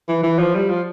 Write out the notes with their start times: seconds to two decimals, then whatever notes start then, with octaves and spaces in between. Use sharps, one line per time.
0.09 E3
0.23 E3
0.39 F3
0.55 G3
0.69 F3